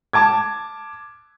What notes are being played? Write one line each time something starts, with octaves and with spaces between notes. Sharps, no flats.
A5 D6 G#6